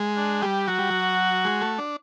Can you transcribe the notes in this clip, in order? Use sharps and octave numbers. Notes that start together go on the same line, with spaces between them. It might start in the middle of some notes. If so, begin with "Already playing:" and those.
Already playing: G#3
D4
G3 G4
F#3 F#4
G3
F#3
G#3
A3
D4